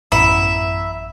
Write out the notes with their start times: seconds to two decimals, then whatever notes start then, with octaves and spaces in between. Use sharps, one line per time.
0.12 A1 F#2 B3 E4 E5 A#5